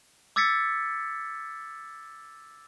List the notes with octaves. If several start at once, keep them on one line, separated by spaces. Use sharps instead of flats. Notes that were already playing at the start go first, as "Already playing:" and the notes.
D6 E6 G#6 A6 B6 C#7